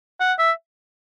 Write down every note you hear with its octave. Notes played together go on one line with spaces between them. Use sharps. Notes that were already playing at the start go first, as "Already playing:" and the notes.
F#5
E5